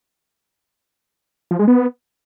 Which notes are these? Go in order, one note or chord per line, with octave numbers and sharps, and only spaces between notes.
F3
G#3
B3